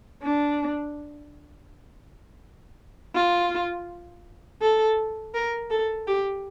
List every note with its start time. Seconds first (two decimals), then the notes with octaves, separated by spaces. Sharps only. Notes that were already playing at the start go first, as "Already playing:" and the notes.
0.23 D4
3.14 F4
4.61 A4
5.34 A#4
5.70 A4
6.07 G4